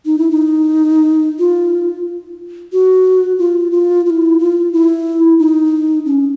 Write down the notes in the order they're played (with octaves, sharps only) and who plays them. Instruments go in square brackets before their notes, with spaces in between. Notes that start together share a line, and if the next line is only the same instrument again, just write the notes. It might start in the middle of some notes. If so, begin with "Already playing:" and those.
[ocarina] D#4
E4
D#4
F4
F#4
F4
F4
F4
E4
F4
E4
D#4
C#4